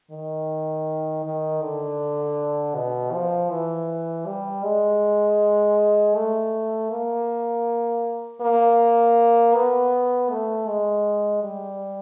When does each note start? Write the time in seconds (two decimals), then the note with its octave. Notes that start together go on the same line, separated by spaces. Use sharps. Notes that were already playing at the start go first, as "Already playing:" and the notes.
0.11 D#3
1.24 D#3
1.62 D3
2.75 B2
3.13 F3
3.50 E3
4.26 G3
4.64 G#3
6.15 A3
6.90 A#3
8.41 A#3
9.55 B3
10.30 A3
10.68 G#3
11.43 G3